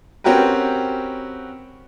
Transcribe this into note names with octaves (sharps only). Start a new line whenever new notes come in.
C4 C#4 F#4 G4 A#4 B4